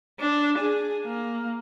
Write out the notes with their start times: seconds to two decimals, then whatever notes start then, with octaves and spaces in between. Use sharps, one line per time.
0.20 D4
0.58 G#4
1.06 A#3